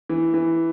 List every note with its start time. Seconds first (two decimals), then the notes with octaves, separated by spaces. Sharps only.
0.09 E3
0.34 E3